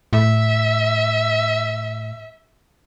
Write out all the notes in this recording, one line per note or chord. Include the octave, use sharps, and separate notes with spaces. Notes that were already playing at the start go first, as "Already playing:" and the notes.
A2 E5